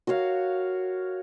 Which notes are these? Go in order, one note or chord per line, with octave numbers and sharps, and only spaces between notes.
F#4 A#4 C#5 F5